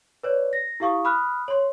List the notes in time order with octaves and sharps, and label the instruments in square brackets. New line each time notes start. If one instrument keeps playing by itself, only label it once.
[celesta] B4 C#5 D5
A#6
E4 G4 F5 C#6 D#6
B5 D#6 F6 F#6
C#5 C6